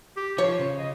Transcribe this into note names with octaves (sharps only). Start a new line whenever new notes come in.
G4
F3 F4 C#5
C#3
D#5